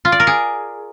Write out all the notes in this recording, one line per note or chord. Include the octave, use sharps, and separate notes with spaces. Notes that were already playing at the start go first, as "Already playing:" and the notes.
F4
D5
A#4
G#4